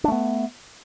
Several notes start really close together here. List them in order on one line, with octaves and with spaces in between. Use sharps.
D4 A3 B3